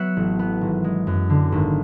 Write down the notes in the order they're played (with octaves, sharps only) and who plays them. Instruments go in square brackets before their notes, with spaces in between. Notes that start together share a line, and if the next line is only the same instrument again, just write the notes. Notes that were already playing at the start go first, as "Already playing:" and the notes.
Already playing: [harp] F#3 B3 E5 F#5
A1
B3
G#1
G#3
F#2
D3
G#1